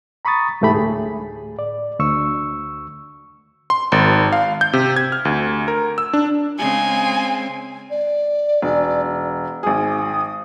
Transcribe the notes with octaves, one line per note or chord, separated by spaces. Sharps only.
A#5 B5 C#6 D#6 A6
C2 G#2 E3 A3 G4 B5
D2 A2 G#4
D5
D2 C#6 E6
C6
G#1
F5
G6
C3
G#6
F6
D2
A#4
E6
D4
C#3 G#3 C4 G#5
D5
E1
G#1 G#4 D#6